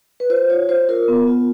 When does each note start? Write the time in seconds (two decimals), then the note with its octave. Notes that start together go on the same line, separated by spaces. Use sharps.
0.20 B4
0.30 F4 C5
0.49 F4 C#5
0.69 F4 C5
0.89 F4 A#4
1.08 B3
1.27 F4